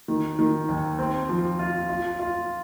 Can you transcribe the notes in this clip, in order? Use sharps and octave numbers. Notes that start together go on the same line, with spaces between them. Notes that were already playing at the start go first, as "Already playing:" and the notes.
D#3
D#3
D#2
C4
F3
F4
F4
F4